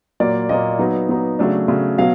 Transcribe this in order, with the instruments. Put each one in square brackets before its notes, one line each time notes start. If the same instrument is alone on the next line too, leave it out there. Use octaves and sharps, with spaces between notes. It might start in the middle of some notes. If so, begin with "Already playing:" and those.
[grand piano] A#2 F#3 A#3 D5
A#2 F#3 A#3 D#5
F#3 B3 D#4
F#3 B3 D#4
C#3 F#3 A3 D4
C#3 F#3 A3 D4
B2 F#3 F5